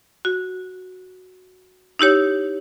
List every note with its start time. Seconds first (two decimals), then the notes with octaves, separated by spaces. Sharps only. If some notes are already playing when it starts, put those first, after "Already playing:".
0.25 F#4
1.99 D#4 E4 G4 C#5